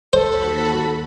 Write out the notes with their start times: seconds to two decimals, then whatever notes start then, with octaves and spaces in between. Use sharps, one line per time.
0.13 D#2 F#4 A4 C5 B5